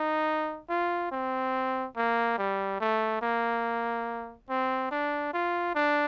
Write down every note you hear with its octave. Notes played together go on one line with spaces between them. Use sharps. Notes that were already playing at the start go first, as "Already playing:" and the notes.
Already playing: D#4
F4
C4
A#3
G3
A3
A#3
C4
D4
F4
D4